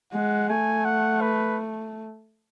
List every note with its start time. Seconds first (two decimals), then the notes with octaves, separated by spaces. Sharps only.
0.13 G#3 F#5
0.49 A3 G#5
0.85 F#5
1.21 B4